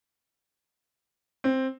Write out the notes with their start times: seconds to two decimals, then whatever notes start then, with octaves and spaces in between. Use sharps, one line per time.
1.44 C4